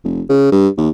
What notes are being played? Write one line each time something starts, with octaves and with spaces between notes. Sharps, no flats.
F1
C#3
G2
D#2